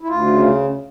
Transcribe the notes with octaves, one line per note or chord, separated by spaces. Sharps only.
E4
D2 F4
C#3